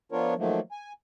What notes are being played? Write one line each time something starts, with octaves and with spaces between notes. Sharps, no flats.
F3 B3 D4 F4 A#4 C#5
D#3 F3 F#3 A3 A#3
G#5